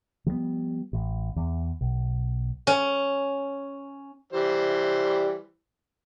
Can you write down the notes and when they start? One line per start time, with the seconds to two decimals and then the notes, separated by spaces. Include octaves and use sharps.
0.26 F3 G3 A3 B3
0.93 A1
1.36 E2
1.81 B1
2.67 C#4
4.33 E3 G3 C5